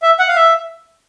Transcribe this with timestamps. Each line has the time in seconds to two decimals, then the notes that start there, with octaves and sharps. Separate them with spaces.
0.02 E5
0.19 F#5
0.28 F5
0.36 E5